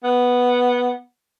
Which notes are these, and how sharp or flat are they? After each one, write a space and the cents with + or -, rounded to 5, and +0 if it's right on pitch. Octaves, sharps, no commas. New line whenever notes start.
B3 -5